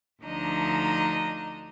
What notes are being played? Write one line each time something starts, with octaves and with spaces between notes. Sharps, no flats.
D2 F3 D4 D#4 D#5 A#5